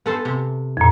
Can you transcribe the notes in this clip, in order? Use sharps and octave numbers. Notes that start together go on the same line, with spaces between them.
B3 A4 C5
C3
F2 A#2